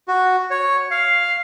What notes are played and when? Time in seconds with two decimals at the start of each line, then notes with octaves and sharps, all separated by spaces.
0.08 F#4
0.51 C#5
0.91 F5